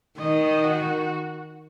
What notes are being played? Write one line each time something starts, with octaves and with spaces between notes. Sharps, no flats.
D#3 D#5
F#4